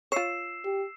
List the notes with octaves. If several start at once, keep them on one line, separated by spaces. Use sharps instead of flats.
F4 C#5 E6 C7 E7
G4